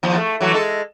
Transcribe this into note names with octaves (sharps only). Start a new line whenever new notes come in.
D#2 F3
A3
E3 F#3 A3
G#3 A4